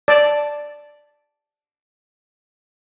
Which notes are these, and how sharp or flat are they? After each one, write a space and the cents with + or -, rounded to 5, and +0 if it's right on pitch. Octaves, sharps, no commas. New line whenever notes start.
D5 +0 A5 +0